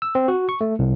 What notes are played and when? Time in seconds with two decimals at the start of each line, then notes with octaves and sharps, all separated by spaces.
0.02 E6
0.15 C4
0.28 F#4
0.49 C#6
0.61 A3
0.79 C2